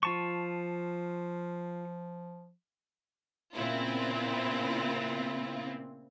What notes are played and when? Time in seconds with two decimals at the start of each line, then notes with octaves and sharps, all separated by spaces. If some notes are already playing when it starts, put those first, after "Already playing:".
0.03 F3 F4 A5 C#6
3.54 A#2 C#3 B3 C4 E4 F4